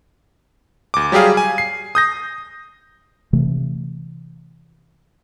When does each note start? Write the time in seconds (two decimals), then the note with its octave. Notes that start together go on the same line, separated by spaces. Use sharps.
0.94 D2 D6
1.12 F#3 G3 G4 G#4 F5
1.37 G#5
1.58 C7
1.95 D#6 G6 A#6
3.33 C3 E3 A3